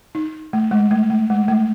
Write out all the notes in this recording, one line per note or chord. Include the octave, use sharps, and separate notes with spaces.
D#4
A3
G#3
A3
A3
G#3
A3